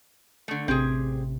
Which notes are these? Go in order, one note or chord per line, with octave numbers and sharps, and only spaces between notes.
D3 A3
A1 C3 C4 G4 G#4